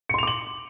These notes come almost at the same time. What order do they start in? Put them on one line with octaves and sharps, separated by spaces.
C#7 C6 F7 D6 F#7